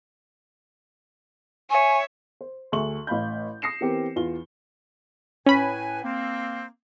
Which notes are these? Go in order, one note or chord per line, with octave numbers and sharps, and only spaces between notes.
C#5 E5 G#5
C5
D2 G#4 E5 C#6 F#7
A1 F5 B5 G6
D#6 A#6 C7 C#7 E7
E3 B3 C4 G4 A#4
E2 F4 G7
A2 C#4 B4 G#5 B5
A#3 C4